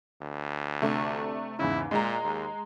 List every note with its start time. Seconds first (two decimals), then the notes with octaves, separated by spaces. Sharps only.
0.22 D2
0.82 C3 A3 D4
1.59 E2 G#2 C#3 E4
1.91 A#2 G#3 A#5
2.24 D#2